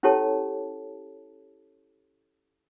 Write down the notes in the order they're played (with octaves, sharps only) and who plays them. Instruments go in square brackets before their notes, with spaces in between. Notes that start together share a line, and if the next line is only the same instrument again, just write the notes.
[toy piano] C#4 E4 G4 A4 C#5 A5